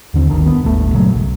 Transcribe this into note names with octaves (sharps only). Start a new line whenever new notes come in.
D#2 D3 C4
G1 D2 D#3 D4
B3
D#1 G#1 A3
G2 A#2 C#3 F#3
B1